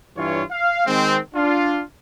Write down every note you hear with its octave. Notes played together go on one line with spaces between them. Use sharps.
G2 E3 F4 C#5
F5
D#3 G#3 C4
D4 F4